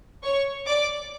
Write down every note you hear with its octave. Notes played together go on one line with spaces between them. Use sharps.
C#5 C#6
D5 D6